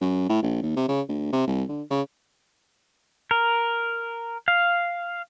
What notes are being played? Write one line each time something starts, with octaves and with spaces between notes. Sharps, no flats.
F#2
A2
A#1
D#2
C3
C#3
D2
C3
C2
D3
C#3
A#4
F5